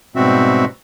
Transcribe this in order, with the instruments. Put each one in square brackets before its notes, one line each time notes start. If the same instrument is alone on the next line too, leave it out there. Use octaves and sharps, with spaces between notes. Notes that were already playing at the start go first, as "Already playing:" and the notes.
[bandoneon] G#2 B2 G3 C4 F#4 E5